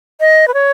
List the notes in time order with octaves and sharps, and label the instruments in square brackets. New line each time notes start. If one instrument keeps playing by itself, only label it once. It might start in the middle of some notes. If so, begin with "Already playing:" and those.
[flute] D#5
B4
C#5